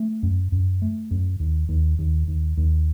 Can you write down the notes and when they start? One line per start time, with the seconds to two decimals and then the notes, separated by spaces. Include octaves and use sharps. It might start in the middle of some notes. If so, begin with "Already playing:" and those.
Already playing: A3
0.23 F#2
0.52 F#2
0.82 A3
1.11 F#2
1.40 D#2
1.69 D#2
1.99 D#2
2.28 D#2
2.57 D#2